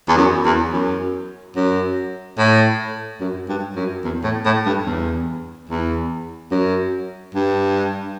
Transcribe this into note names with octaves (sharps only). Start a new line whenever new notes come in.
E2
F#2
E2
F#2
F#2
A2
F#2
G2
F#2
E2
A2
A2
G2
E2
E2
F#2
G2